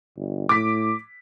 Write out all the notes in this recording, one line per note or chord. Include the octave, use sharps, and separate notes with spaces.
G1
A2 D6 B6